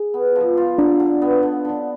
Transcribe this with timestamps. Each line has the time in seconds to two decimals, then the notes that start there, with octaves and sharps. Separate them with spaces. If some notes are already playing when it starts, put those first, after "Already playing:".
Already playing: G#4
0.14 B3
0.36 F3
0.57 F4
0.78 D3 D4
1.00 D3
1.22 B3
1.43 D3
1.65 D3